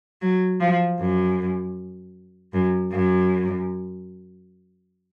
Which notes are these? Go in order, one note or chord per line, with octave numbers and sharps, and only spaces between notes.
F#3
F3
F#2
F#2
F#2